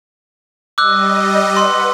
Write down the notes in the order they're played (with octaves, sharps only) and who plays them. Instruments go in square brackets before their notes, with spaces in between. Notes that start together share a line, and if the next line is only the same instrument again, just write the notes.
[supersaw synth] G3 D#5 [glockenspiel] D6 E6 F#6
[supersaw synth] B4 F#5 [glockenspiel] C6